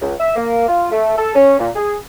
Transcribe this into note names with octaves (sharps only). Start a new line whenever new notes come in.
C#2
E5
A#3
F4
A3
A4
C#4
A#2
G#4